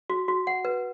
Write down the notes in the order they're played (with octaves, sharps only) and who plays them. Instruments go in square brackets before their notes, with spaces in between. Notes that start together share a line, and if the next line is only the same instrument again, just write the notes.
[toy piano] F#4
F#4
F#5
B4